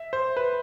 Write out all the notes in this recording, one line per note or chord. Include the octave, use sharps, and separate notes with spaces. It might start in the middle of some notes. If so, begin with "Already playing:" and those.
Already playing: E5
C5
B4